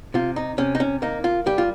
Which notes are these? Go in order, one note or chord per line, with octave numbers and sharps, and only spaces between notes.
C3 F4
D#4
C3 C#4
D#4
C#4
A#3 D#4
F4
G3 G4
F4